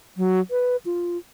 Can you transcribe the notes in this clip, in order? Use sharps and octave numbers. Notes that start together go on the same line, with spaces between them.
F#3
B4
F4